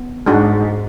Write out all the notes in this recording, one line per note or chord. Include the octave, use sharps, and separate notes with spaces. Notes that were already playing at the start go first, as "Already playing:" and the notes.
Already playing: B3
G#2 G#3 D4 F#4